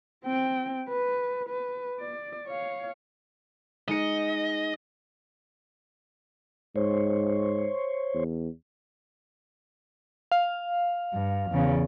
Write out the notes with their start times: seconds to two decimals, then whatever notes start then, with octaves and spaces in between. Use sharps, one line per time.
0.24 C4 G5
0.89 B4
1.49 B4
1.99 D5
2.47 C#5 F5
3.88 G#3 D#4 D#5 C#7
6.76 G#2 C5 C#5
8.14 E2
10.32 F5
11.13 G2
11.51 E2 C#3